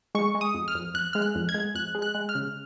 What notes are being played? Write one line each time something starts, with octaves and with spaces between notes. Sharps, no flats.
G#3 C#6
G#3
D#6
F2
F6
F2
F2 F#6
G#3 F6
F#6
F2
G#6
G#3
F2 F#6
G#3
F#6
G#3
F6
C#3